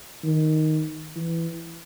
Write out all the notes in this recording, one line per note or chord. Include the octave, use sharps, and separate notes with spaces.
D#3
E3